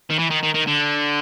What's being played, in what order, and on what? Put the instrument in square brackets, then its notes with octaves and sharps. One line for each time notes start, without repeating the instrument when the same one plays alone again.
[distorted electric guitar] D#3
E3
D#3
D#3
D#3
D3